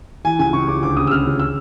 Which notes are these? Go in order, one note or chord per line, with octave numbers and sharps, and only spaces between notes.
E3 G#5
C#2 G#5
C#2 C#6
C#2 D6
D2 D6
C#3 D#6
E6
C#3 F6
C#3
E6